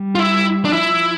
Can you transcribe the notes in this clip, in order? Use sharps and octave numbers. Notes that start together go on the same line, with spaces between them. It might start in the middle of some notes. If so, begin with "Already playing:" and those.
Already playing: G3
F4
E4
D4
F3 E4